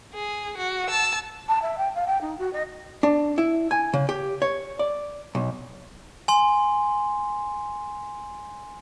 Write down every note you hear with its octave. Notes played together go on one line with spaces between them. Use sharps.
G#4
F#4
A5 E6
A5
E5
G5
F5
G5
D#4
F#4
D#5
D4
E4
G#5
C#3
G4
C#5
D5
B1
G#5 C6